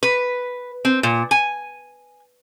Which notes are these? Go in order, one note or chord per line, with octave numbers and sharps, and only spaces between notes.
B4
C4
A#2
G#5